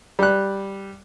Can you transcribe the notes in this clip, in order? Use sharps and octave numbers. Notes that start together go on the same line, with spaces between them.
G3 F#6